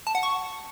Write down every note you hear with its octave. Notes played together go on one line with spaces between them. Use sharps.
A5
F#5
C#6